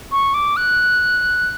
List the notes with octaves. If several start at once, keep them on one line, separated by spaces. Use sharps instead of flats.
C#6
D6
F#6